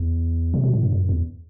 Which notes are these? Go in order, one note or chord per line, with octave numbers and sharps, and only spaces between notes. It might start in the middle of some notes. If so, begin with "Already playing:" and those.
Already playing: E2
C3
B2
A2
G2
F#2
E2